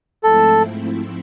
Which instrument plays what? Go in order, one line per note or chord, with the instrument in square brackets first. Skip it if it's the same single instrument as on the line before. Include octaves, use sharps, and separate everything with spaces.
[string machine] G#2 F3 A3 C4 E4 [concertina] A4